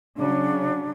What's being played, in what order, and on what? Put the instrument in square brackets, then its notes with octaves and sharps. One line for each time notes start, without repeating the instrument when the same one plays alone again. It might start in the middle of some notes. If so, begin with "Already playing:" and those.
[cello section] C#3 F#3 [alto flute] D4